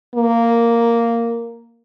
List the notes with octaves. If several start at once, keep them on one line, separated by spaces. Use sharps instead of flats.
A#3